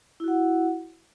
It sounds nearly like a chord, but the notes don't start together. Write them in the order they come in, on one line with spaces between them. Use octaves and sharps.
E4 F#4 F#5